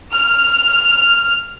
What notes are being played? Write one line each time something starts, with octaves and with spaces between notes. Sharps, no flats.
F6